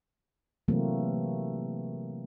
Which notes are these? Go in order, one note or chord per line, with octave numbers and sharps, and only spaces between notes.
C3 E3 F#3 A3 A#3 C4